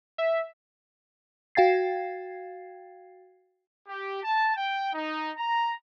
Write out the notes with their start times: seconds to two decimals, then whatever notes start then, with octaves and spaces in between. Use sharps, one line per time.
0.18 E5
1.55 F#4 F5 G5 G#6 A6 C7
3.88 G4
4.24 A5
4.56 G5
4.93 D#4
5.37 A#5